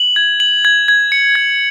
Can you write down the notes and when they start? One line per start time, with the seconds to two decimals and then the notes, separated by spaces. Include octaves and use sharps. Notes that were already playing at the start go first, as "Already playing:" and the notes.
Already playing: F#7
0.16 G#6
0.40 F#7
0.65 G#6
0.88 G#6
1.12 C#7
1.35 G#6